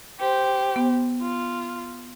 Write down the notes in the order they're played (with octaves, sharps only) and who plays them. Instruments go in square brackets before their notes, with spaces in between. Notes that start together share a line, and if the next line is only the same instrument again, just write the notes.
[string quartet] G4 C5
[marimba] B3
[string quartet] F4